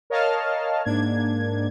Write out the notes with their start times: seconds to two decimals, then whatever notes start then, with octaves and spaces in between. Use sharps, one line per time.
0.10 A#4 C#5 D#5 F5 A5 F6
0.85 G#2 A#3 D4 G#6